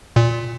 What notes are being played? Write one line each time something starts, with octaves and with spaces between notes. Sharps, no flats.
A#2